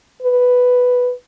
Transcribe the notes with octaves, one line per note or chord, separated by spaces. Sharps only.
B4